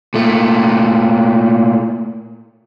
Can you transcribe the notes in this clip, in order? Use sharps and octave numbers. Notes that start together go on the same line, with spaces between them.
A#2 A3